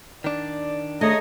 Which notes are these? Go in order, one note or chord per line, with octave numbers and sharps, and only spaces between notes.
D#3 D4 D5
A3 D#4 G#4 C#5 D#5